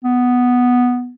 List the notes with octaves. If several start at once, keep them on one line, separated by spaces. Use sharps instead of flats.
B3